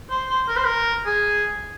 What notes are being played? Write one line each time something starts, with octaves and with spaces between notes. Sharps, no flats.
C5
C5
A#4
C5
A#4
G#4